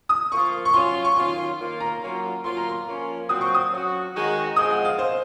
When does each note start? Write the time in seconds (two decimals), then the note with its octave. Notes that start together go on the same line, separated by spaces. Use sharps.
0.09 D#6
0.32 F3 A#3 F4 C#6
0.65 C#6
0.73 F#3 C#4 F4 C6
1.04 C#6
1.16 D#3 F#3 C#4 F4 C6
1.59 D#3 A#3 F4
1.80 A#5
2.01 F#3 A#3 C#4 F4
2.44 F#3 A#3 F4 C6
2.57 A#5
2.69 C6
2.86 F3 A#3 C#4
3.29 A#2 F#3 C4 D#6
3.41 C#6
3.54 D#6
3.71 F#3 C#4 F#4
4.14 D#3 G#3 D#4 F#4
4.56 F3 G#3 C4 D#6
4.71 F#5
4.85 F5
4.98 C5